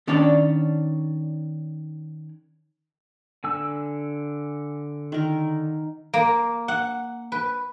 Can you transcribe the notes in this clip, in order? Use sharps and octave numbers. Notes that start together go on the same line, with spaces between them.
D#3 C#4 D4 C#5 D5
D3 G#5 E6
D#3 A#4
A#3
F#5
B4